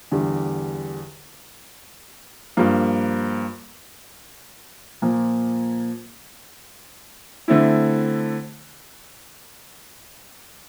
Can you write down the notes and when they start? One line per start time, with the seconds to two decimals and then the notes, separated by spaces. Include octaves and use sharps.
0.12 E2 D3 G3
2.57 G2 F3 A#3
5.02 A#2 F3 A#3
7.48 D3 A3 C4 E4